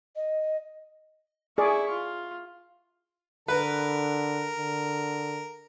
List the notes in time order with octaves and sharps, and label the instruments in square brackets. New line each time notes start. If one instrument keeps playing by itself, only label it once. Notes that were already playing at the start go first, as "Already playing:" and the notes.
[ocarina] D#5
[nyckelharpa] E4 C#6 [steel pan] G#4 D5
[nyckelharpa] F4
[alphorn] D3 [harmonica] A#4 [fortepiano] B4
[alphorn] D3